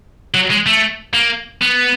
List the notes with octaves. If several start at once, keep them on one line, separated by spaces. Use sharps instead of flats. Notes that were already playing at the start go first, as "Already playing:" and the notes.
F#3
G#3
A3
A#3
B3